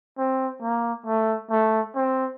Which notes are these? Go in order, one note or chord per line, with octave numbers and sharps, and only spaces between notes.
C4
A#3
A3
A3
C4